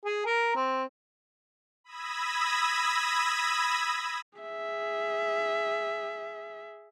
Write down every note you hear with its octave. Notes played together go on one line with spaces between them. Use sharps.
G#4
A#4
C4
B5 D#6 E6 G#6 A#6
G#4 E5